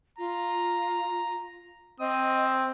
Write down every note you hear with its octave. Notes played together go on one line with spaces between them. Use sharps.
F4 A#5
C4 D#5 D#6